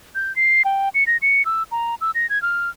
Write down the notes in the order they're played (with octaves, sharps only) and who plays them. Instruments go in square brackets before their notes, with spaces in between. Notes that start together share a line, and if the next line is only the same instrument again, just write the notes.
[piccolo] G6
C7
G5
C#7
A#6
C#7
E6
A#5
E6
A#6
G#6
F6